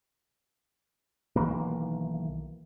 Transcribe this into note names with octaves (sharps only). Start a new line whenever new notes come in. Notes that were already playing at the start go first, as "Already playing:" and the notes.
B1 D#3 E3 A#3